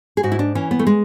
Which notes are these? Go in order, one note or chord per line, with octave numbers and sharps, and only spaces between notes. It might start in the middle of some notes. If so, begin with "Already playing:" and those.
G#4
G#2 F#4
E4
D4
E3 C#4
B3
A3
G#3